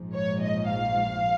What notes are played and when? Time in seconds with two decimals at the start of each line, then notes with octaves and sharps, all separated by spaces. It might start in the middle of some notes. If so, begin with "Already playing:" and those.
Already playing: A#1 G#2 F3
0.13 C#5
0.42 D#5
0.70 F5